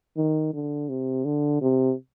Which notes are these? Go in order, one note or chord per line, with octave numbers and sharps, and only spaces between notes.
D#3
D3
C3
D3
C3